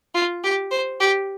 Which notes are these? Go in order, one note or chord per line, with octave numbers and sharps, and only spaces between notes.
F4
G4
C5
G4